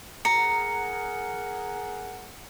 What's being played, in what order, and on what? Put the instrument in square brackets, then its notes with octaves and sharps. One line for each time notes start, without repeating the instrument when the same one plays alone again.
[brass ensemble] G#4 A#4 F#5 [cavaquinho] A#5 [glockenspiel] C#7